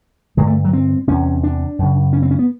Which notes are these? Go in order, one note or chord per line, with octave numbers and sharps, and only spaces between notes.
G2 D3 G#3
A3
F#3
C4
E2 C3 C#4
D4
F#2 C#3
C#4
C4
C#4
B3